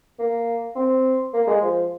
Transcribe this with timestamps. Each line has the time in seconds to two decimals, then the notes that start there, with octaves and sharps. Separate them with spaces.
0.19 A#3
0.75 C4
1.34 A#3
1.47 G#3
1.62 F3